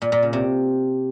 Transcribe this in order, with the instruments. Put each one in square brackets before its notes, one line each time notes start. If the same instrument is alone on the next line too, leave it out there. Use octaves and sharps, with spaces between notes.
[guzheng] A#2
A#2
C#3
C3